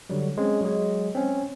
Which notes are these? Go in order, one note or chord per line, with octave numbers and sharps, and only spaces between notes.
D3 F#3 G3
G#3 C4 C#4
F#3 G#3
C4 C#4